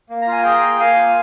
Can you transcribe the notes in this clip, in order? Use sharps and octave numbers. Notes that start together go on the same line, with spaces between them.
A#3
A#5
F4 G#5
G#4 G5 A#5
A#3
A#3 F5 G#5
F4